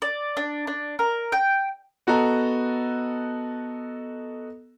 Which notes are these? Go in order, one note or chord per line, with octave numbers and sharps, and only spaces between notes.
D5
D4
D4
A#4
G5
B3 F#4 A4 D#5 A#5